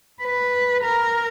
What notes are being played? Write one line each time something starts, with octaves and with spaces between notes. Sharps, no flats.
B4
A#4